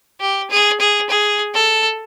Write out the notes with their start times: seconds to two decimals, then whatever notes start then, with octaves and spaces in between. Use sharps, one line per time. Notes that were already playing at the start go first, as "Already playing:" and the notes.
0.21 G4
0.50 G#4
0.80 G#4
1.09 G#4
1.54 A4